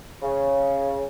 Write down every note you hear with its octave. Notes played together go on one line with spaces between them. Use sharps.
C#3